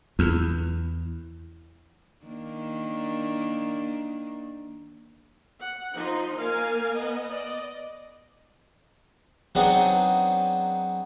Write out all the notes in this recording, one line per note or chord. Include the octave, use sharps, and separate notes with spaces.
E2
D#3 A#3 D4
F#5
F3 D#4 C6
A#3 A#4 F5 G#5
B3 D#5
D5 D#5
F#3 B3 C4 D4 D#4 G#4